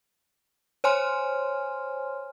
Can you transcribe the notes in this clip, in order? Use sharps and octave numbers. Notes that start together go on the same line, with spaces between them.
C5 C#5 G#5 C6 F6